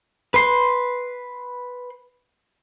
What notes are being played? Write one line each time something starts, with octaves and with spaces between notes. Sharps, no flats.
B4 C6